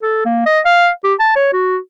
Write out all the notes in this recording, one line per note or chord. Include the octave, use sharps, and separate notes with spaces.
A4
A#3
D#5
F5
G4
A5
C#5
F#4